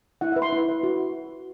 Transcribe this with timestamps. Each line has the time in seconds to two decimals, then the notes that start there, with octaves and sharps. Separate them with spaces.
0.21 E4 F#5
0.32 E5
0.36 B4
0.42 C6
0.52 E4
0.68 B4
0.83 F#4